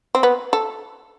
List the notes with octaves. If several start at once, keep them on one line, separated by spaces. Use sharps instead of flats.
C4
B3
A4